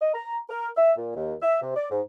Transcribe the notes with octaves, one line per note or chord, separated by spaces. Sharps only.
D#5
A#5
A#4
E5
A#2
D#2
E5
C3
D5
G#2